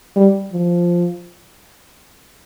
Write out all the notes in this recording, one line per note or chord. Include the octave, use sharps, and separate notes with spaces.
G3
F3